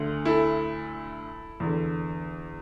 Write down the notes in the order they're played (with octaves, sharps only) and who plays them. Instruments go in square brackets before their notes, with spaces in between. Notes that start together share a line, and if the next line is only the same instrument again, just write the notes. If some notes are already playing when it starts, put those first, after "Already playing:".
Already playing: [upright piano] D2 D3
E4 A4
E2 D3